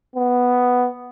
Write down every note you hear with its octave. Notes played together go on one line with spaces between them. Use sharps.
B3